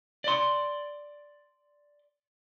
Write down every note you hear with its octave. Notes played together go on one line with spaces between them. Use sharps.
D5 C6